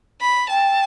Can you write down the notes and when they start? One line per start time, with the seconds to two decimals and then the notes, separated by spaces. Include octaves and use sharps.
0.21 B5
0.50 G5 A5